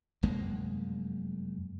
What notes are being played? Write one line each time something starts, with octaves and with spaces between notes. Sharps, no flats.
F1 F#2 G#3 A#3